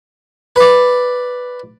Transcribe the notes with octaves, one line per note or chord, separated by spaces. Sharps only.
B4 D5